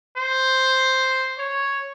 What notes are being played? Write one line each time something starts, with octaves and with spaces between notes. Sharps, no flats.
C5
C#5